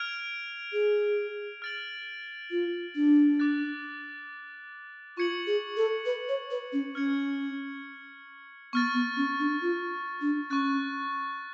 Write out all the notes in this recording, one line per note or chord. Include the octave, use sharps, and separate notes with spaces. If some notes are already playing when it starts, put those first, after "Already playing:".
Already playing: F6 G#6 D7 F7
G#4
F6 A6 D7 F#7
F4
D4
D6 F#6 A6
F4 C#6 G#6 C#7 F#7
G#4
A4
B4
C#5
B4
C#4
C#4 F6 G#6 C#7
B3 C#6 F6 A6
B3
C#4
D4
F4
D4
C#4 C#6 F#6 A6